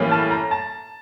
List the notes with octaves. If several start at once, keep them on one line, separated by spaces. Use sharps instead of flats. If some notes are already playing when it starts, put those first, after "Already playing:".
Already playing: A2 E3 G3 A#3 C#4
A5
A#5
A5